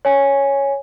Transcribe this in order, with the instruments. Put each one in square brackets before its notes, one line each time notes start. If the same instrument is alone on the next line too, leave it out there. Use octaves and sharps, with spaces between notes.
[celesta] C#5 G#5